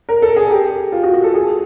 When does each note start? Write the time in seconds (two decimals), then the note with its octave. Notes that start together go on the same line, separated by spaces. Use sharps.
0.09 A#4
0.22 A4
0.36 G#4
0.51 G4
0.92 F4
1.03 F#4
1.14 F#4
1.24 A4
1.34 G#4